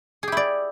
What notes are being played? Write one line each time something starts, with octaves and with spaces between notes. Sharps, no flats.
E4 G4 G#4 D5